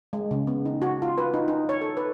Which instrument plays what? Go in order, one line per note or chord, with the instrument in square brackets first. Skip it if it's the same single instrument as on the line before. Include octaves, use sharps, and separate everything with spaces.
[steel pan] G#3
C#3
B3
D#4
F#4
F4
B4
D#4
D#4
C#5
A4
B4